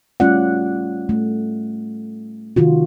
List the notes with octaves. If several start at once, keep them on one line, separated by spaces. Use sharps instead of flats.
G3 A3 C#4 F4 D5 F#5
A3
C3 D#3 F4 F#4